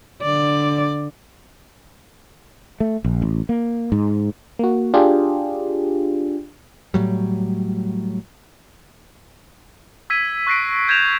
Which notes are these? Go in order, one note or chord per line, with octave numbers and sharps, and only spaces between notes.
D3 D5
A3
A#1
A1
A#3
G#2
A#3 F#4
D4 F4 G4 G#4
A2 F#3 G3
E6 G#6 B6 D#7
C#6 F#6 A#6 C7 D7
G6 G#6 A#6 D7 E7 F7